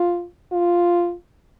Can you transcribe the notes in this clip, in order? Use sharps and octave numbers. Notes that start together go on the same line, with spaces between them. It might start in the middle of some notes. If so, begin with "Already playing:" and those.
Already playing: F4
F4